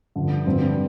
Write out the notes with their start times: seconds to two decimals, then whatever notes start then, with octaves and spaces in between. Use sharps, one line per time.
0.16 G2 D3 F3
0.46 G2 D3 F3 C4 F4